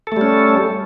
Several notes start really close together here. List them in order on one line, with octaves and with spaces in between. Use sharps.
A4 A3 G3 C#4